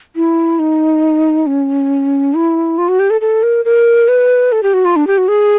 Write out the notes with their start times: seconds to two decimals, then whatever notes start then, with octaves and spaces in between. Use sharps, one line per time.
0.16 E4
0.59 D#4
1.47 C#4
2.34 E4
2.78 F4
2.89 F#4
2.99 G4
3.10 A4
3.21 A4
3.43 A#4
3.65 A#4
4.08 B4
4.52 A4
4.63 G4
4.74 F#4
4.85 F4
4.96 D4
5.07 G4
5.18 F#4
5.28 G#4